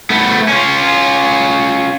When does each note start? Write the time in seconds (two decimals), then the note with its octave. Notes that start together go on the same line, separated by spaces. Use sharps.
0.10 A3 B3
0.48 C#4 F4